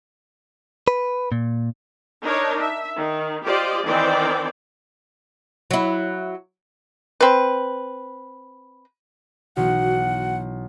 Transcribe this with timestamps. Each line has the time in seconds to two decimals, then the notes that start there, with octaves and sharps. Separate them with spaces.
0.88 B4
1.32 A#2
2.22 D4 D#4 A#4 C#5
2.60 E5
2.97 D#3
3.43 F4 G4 C5 D5 D#5
3.85 D#3 E3 C4 C5 D5 G5
5.71 F#3 E4
7.21 C4 B4
9.57 B1 E3 F#4 F#5